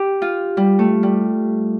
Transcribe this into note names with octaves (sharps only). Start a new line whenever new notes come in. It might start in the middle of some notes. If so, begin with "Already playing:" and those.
Already playing: G4
F4
G3
A3
G3